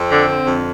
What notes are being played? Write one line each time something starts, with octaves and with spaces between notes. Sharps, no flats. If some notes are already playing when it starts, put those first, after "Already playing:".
Already playing: F2 C4
D3
D3
F2